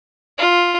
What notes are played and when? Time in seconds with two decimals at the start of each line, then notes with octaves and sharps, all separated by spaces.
0.38 F4